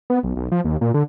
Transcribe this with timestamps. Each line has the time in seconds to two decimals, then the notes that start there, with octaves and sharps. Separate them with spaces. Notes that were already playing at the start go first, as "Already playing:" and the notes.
0.10 B3
0.24 B1
0.36 B1
0.52 F3
0.65 D#2
0.81 A#2
0.94 D3